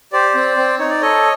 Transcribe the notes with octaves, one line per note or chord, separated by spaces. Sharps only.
G4 C5 D5
C4
C4
D#4 C#5
D5
A4 C#5 D#5